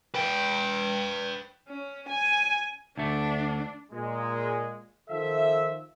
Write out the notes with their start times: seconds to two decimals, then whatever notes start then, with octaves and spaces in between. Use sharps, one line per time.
0.15 B4 G5
1.69 C#4
2.09 G#5
2.98 D2 A3 D4
3.92 A#2 G#3
5.10 D#3 F3 A4 E5